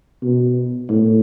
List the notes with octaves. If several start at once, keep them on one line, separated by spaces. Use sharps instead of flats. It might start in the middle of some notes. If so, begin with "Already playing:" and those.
B2
A2